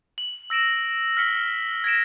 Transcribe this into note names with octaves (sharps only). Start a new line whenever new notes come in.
F#7
E6 A#6 D7 E7
F6 B6 C#7 G7
G#6 A#6 D7 E7